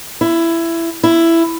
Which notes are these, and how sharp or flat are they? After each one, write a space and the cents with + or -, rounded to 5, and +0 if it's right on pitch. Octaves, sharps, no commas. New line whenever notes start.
E4 +15
E4 +10